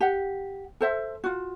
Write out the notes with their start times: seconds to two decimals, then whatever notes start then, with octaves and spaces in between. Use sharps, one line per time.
0.01 G4 F#5
0.81 A4 C5 E5
1.24 F4 F#4